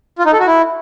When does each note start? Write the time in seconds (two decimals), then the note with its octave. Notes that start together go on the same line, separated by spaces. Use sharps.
0.19 F4
0.26 D#4
0.33 A4
0.40 F#4
0.47 E4